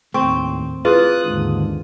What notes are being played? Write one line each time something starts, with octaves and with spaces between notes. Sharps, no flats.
D#2 A2 C4 C#6
E4 F4 G#4 B4 D#6 F#6
D#2 G#2 D3